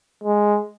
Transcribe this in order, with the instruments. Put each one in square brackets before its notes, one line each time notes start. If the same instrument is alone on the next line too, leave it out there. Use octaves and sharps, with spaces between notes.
[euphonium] G#3